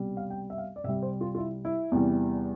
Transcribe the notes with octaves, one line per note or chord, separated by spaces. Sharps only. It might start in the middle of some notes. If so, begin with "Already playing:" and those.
Already playing: C2 B2 G3
F5
G5
E5
F5
D5
C2 C3 G3 E5
C5
F4
F4
E4
E4
E2 C3 E3 G3